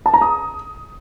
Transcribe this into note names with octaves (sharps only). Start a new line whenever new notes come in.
A5
A#5
D#6